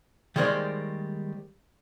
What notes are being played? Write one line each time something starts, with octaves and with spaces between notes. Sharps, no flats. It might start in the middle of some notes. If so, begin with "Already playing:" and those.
D#3 G3 G#3 A#3 C5 D5